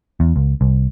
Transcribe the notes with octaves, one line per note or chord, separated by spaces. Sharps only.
E2
C#2
C2